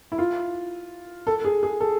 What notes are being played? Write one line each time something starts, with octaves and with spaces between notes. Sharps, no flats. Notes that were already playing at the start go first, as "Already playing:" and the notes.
E4
F4
A4
G#4
G#4
A4